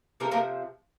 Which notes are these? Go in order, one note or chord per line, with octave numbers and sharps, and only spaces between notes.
C3 F3 A#3 A#4
A#3 A#4